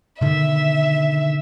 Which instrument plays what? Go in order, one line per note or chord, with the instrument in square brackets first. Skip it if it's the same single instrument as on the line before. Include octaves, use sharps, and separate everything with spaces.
[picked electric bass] B2 D3 D#3 [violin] E5